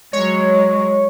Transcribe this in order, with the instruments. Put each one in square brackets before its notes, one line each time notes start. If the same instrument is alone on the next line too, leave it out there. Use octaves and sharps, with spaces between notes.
[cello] F#3 G#3 [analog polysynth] C#5